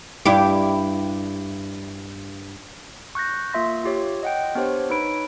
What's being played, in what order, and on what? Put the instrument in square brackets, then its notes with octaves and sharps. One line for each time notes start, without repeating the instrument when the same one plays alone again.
[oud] G2 E4 G4
[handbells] C#6 F#6 G6 A#6
A#3 F4 E5 C6 A#6
F4 G4 C#5
D#5 F#5 G5
B3 D4 G4 C5 C#5
D#4 B4 C#5 B5 D7